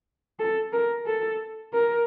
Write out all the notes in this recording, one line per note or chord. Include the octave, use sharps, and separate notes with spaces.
A4
A#4
A4
A#4